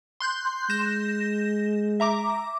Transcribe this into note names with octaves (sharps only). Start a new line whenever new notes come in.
C6 F#6 G6
G#3 G6 A#6 E7
E5 A#5 D6